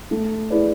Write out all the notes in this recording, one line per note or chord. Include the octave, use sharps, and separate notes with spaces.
A3
E4 G#4 B4 D5